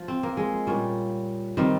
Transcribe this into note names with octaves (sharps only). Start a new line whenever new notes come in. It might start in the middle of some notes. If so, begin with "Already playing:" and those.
Already playing: F3
C4
A#3
G#3
A#2 G3 C#4
D#3 G3 C4